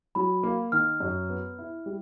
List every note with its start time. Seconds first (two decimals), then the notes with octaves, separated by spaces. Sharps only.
0.15 F#3 B5
0.43 A#3
0.72 D#3 F6
1.00 F#2
1.29 B3
1.59 E4
1.86 G3